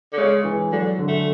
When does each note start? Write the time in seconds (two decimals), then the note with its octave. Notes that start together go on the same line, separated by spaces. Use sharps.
0.13 D3
0.17 C#3 G#3
0.44 E3
0.72 D3 F#3
0.99 D3
1.08 A3